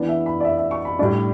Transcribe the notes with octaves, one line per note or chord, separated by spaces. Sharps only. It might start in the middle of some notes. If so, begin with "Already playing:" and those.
Already playing: E3 B3 D4 D5
E5
B5
D5
E5
E5
C#6
B5
A2 G3 D4 D5